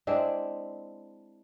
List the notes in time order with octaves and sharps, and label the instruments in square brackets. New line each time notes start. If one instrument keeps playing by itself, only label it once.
[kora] G#3 C4 D4 E4